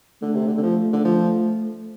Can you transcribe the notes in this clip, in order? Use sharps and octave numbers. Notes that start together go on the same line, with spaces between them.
D3 A3
C3
D3
D3
F3
D3
F3